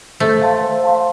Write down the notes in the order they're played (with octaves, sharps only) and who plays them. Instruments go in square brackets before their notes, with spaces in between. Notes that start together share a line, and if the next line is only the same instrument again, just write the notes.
[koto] A3 [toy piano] C5
[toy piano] F5 A5 C6
C5
F5 A5 C6